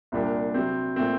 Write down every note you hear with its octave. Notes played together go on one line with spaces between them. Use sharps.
C2 A#2 G3 D4 G4
C3 F#3 C4
A#2 A3 C4